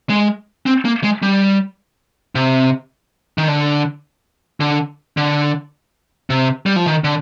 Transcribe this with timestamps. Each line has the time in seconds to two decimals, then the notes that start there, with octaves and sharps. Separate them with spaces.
0.10 G#3
0.66 C4
0.85 A#3
1.04 G#3
1.23 G3
2.35 C3
3.38 D#3
3.48 D3
4.60 D3
5.17 D3
6.30 C3
6.66 G3
6.76 F3
6.86 D#3
7.04 D3